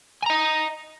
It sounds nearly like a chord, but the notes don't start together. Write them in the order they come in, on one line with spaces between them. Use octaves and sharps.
G#5 A#5 D#5